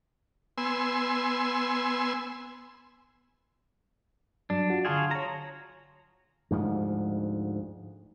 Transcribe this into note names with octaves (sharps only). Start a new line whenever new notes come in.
B3 G#5 C6 E6
G2 F#3 D4
F4 F#4
D3 F4 F#4 G#4 A5 G#6
C#5 A#5
D2 G#2 F3